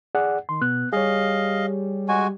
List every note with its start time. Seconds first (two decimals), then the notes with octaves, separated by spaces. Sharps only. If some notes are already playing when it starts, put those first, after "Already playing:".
0.15 G#4 D5 F#5
0.49 D#3 C6
0.62 B2 B3 F#6
0.92 G3 G#4 C#5 D#5 F5
2.08 G#3 F#4 G#5